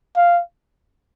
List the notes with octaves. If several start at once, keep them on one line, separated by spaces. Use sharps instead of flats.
F5